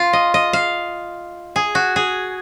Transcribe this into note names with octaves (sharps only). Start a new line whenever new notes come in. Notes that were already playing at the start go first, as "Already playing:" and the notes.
Already playing: F4
D#5
D#5
F5
G#4
F#4
G#4